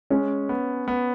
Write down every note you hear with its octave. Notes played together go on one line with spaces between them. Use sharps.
G#3 C#4
B3
B3